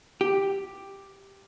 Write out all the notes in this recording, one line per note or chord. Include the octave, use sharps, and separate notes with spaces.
G4